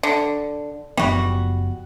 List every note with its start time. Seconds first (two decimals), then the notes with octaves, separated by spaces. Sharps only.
0.03 D3
0.97 F#1 F3 G3 B3 F#4